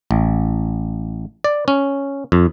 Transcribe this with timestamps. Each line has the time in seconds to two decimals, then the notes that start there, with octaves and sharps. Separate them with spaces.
0.11 A1
1.44 D5
1.68 C#4
2.32 F2